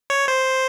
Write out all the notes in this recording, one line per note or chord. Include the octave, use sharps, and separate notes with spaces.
C#5
C5